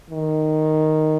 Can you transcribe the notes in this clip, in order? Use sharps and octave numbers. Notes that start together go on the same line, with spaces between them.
D#3